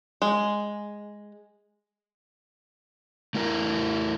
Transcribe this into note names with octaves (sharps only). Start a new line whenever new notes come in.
G#3
A3 E4 A#4